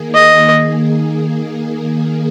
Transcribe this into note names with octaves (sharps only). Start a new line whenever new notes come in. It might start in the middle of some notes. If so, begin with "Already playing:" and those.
Already playing: D#3 A#3 G#4
D#5